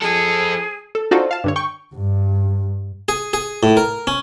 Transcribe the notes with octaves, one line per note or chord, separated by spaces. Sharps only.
F3 G#4 A4
A4
D4 D#4 F4 F#4 A4 C5
F5 A5
G2 D3 C#5
G5 C#6
G2
G#4
G#4
A2
A#4
C#4